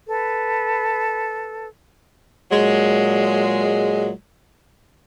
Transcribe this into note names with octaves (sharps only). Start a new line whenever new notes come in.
A4 B4
A#2 F#3 G#3